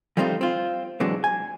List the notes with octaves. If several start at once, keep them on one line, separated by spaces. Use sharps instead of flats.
F3 G3 A3 C4 D#4 F4
C4 F4
G#2 C3 E3 F#3 G#3 D4
G#5